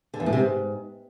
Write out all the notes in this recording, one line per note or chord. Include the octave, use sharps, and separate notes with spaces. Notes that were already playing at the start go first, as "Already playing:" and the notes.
D3
E2
A2
C3
G#2